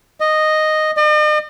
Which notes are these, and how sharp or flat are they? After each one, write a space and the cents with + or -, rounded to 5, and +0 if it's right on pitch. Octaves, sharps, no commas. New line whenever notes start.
D#5 -5
D#5 -45